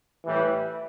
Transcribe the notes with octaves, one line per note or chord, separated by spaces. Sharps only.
A2 E3 G3